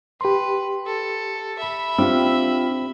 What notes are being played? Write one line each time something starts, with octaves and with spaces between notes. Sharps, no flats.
G4 B4 C6
A4
E5 B5
C4 D4 F4 G4 E6